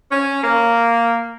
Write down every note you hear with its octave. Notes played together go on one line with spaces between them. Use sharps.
C#4
A#3